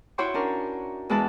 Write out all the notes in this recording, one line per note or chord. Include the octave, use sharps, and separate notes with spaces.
E4 F#4 C#5 G5 C6 C#6
C#4 D4 A#4
E2 G#3 E4 B4 A5